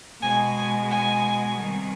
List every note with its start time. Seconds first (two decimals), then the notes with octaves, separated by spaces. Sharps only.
0.21 B2 G#3 G#5
0.57 G#5
0.90 G#5
1.59 C3 D#3 G3